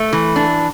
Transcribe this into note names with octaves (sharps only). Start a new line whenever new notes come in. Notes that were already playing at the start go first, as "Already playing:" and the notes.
Already playing: A3
E3
D4